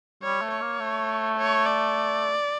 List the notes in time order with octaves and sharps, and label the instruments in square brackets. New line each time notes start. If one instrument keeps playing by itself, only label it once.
[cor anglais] G3 [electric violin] C#5
[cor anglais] A3
[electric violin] C#5
[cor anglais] A#3
A3
[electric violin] C#5
D5